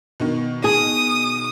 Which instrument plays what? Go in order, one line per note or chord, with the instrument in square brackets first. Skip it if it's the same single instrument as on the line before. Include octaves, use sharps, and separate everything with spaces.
[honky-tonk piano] B2 D#3
[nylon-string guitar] G#4 [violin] D#6